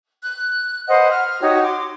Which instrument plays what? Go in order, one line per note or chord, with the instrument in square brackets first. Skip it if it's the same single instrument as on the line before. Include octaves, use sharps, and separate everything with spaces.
[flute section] F#6
B4 C5 D#5 F#5
F6
D#4 F#4 G4 C#5
C6 D6